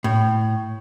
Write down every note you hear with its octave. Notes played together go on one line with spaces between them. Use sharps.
A2